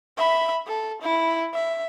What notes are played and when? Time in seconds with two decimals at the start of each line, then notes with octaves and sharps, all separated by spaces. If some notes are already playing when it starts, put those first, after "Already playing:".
0.18 E5 B5
0.67 A4
1.02 E4
1.54 E5